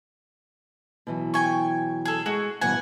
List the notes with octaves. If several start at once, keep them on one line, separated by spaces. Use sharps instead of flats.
B2 E3 F#3
G5 G#5 C#6
G#4 A4
G#3 F#4 G#4
G2 B2 E3 F#5 G#5